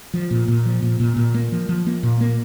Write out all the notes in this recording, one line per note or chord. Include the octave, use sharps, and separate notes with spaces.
F3
A#2
A#2
F3
A#2
A#2
A#2
A#3
F3
F3
A#3
A#2
A#3